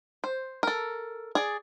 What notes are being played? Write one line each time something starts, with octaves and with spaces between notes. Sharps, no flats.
C5
A4 A#4
G#4 D5